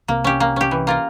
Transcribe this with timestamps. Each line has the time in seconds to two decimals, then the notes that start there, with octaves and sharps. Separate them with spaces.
0.08 C2 C3 A#3
0.24 C#4 G4
0.40 A#3
0.56 C#4 G4
0.71 E3
0.87 A#3 F4 A#4